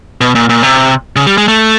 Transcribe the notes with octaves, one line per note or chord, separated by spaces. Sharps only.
B2
A#2
A#2
C3
C#3
G3
G#3
A3